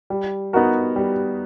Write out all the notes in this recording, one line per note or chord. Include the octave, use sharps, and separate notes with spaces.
G3
B3 D#4 F#4 A#4
G3